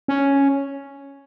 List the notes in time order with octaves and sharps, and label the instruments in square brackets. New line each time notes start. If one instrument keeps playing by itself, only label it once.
[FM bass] C#4